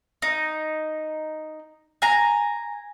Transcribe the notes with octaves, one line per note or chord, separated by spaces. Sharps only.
D#4
G#5 A#5